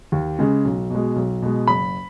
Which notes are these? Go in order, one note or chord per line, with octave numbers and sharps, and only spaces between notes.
D#2
C#3 G#3
B1
B2 G#3
B1
B2 G#3
F#1 B5